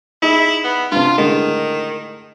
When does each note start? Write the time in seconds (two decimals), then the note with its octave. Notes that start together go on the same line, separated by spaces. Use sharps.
0.22 D#4 E4 G#4
0.64 B3
0.92 G2 C3 F4
1.18 A2 D3 D#3 G#3